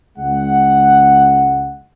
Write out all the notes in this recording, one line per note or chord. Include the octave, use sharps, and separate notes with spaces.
C#2 G#3 F#5